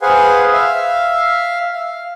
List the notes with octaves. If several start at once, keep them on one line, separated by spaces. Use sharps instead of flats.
G#4 B4 C5 F5 F#5 G#5
E5 F5
F5